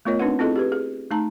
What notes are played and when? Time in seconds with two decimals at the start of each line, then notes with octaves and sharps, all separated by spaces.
0.05 A3 B3 F4 A#4 C#5 D#5
0.19 C4 D4 D#4 B4 F#5
0.39 C4 E4 F4 G#4 A4 D#5
0.56 G4 G#4 B4
0.72 G#4
1.11 A3 D#4 A5 A#5